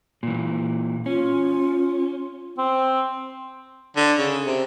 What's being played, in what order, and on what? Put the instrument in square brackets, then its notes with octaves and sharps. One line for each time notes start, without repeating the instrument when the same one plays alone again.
[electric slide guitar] A#2 E3
[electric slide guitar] C#4 [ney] F4
[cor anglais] C4
[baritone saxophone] D3
C#3
C3